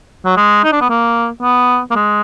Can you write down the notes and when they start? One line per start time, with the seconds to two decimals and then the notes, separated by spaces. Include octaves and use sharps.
0.25 F#3
0.36 G#3
0.64 D#4
0.72 D4
0.81 B3
0.90 A#3
1.42 B3
1.91 A#3
1.95 G#3